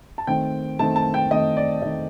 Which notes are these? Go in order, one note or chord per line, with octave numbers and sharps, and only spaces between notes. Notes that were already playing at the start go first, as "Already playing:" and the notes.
A5
D#3 A3 C4 G5
D#3 A3 C4 A5
A5
G5
D#3 A3 C4 D#5
D5
D#3 A3 C4 D#5